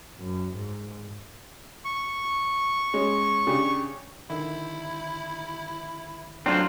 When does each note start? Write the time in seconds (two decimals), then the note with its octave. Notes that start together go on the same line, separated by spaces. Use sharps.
0.18 F#2
0.54 G#2
1.85 C#6
2.94 G#3 C#4
3.47 C#3 D4 G4
4.30 D3 D#3 E4 E5
6.46 A2 F#3 C4 D4 F4 C5 F#6